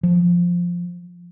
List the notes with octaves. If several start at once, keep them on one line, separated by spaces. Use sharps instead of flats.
F3